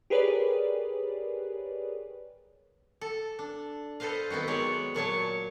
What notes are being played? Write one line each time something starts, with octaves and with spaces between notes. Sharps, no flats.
G4 G#4 A#4 B4 C#5 D5
A4
D4
A4 B4 C5 D#5 F5
D#3 B3 C4 D#4 F#4
F#3 G#3 C#5 D5
A#2 F#3 C#5 A5